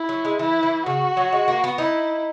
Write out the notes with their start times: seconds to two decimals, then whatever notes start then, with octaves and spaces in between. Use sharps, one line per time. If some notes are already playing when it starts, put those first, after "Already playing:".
Already playing: E4
0.09 F#3
0.25 G#3
0.39 E3 E4
0.63 E3
0.86 C#3 F#4
1.17 F#3
1.33 G#3
1.48 A#3
1.64 B3
1.78 D#4 E4